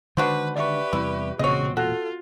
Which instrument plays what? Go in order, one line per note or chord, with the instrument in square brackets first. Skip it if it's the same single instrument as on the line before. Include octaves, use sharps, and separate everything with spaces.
[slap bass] D3 D#3 G#3 [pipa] D4 F#4 C5 [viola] B4
[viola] G4 B4 [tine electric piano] D5 E5 C#6
[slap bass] E2 C3 G3 [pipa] E4
[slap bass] E1 A#2 [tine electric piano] C#3 [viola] C4 F#4 [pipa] C#5 D#5
[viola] F4 [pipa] F#4 [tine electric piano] A4